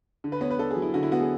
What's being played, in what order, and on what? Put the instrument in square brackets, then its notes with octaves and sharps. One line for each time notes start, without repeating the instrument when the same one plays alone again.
[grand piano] D3
B4
B3 C#5
B4
D4 A4
G#4
F#3
E4
D3 F#4
E4
B3 F#4
G#4